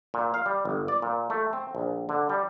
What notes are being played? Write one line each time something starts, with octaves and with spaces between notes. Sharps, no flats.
A#2
F5
G3
G1
D5
A#2
A3
C4
A#1
D3
G3